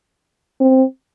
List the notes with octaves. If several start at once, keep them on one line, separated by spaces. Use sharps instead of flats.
C4